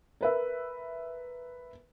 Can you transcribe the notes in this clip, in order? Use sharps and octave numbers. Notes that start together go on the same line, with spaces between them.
A#4 B4 E5